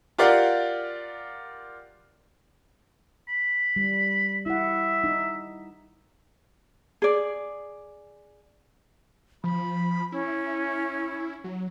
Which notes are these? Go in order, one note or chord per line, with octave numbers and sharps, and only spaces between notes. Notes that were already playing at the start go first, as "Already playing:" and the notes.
F4 G4 A#4 D5 F5 F#5
B5
G3
E4 E5 F#5
D#4
G#4 D5
F3 B5
C#4 E4
F#3